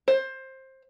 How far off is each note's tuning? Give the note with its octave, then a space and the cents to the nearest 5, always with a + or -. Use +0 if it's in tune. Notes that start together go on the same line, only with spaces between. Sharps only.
C5 +15